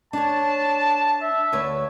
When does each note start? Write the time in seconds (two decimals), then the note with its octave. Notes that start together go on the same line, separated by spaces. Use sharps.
0.13 D4 C#5 A5
1.22 E5
1.52 D2 B4 C#5